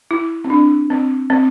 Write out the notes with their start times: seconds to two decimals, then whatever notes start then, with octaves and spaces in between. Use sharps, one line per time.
0.11 E4
0.44 C4
0.50 D4
0.90 C4
1.30 C4